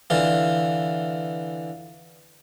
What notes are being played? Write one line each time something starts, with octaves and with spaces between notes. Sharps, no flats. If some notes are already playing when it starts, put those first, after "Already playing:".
D3 E3 F4